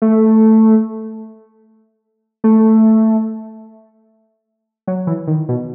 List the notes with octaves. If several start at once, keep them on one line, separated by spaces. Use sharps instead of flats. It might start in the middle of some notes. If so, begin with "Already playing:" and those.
A3
A3
F#3
E3
D#3
B2